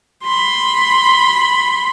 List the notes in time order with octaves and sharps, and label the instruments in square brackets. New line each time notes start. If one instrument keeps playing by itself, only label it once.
[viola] B5 C6